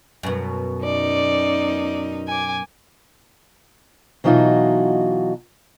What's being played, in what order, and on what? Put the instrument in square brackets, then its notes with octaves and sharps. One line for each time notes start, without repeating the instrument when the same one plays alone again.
[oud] F#2 B2
[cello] C#4 D#4 [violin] D5
[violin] G#5 D6
[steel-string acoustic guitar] B2 E3 F#3 D#4 F4 F#4